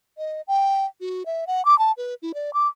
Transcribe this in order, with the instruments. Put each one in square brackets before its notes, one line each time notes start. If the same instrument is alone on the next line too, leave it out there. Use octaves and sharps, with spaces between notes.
[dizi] D#5
G5
F#4
E5
F#5
D6
A5
B4
E4
D5
D6